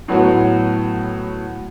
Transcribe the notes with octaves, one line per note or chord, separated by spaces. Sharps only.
A2 F#3 B3 F#4